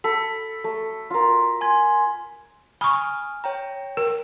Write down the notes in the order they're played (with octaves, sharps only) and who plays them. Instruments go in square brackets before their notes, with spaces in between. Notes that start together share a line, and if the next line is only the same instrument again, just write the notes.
[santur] A4 [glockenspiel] B5 B6
[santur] A3
F4 A#4
[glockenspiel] G#5 C6 G#6
[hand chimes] G#5 D#6 F6 [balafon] B5 C#6
[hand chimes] C#5 G5 A#5
[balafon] A#4